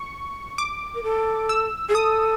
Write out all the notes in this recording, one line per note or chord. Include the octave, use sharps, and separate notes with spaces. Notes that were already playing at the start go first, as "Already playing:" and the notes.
Already playing: C#6
D6
A#4
A4
E6
G#4
A4 D#6